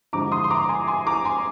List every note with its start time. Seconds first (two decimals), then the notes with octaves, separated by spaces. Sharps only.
0.13 G2 D3 F3 G#3 A#5 D6
0.32 C6 D#6
0.44 C6
0.50 A#5 D6
0.69 G#5 C6
0.88 G#5 C6
1.07 A#5 D6
1.25 G#5 C6